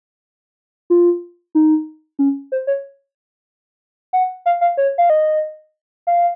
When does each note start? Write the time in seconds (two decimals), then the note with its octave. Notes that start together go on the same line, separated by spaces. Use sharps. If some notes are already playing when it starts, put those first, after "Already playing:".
0.90 F4
1.55 D#4
2.19 C#4
2.52 C5
2.67 C#5
4.13 F#5
4.46 F5
4.61 F5
4.77 C#5
4.98 F5
5.10 D#5
6.07 F5